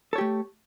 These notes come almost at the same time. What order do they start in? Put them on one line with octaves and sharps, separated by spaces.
A4 C#5 G4 A3